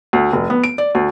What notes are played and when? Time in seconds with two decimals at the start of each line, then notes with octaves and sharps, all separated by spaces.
0.13 D2
0.33 F1
0.50 B3
0.64 D7
0.78 D5
0.95 D2